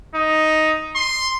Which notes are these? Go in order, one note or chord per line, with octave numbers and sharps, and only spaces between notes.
D#4
C6